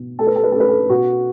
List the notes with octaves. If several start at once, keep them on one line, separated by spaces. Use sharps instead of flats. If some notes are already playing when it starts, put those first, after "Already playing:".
Already playing: B2
A3 A4
B4
A4
B4
C#4 A4
B4
A4
B2 F#4